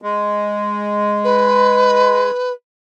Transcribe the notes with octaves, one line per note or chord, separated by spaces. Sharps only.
G#3
B4